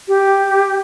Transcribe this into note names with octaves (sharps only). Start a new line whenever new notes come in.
G4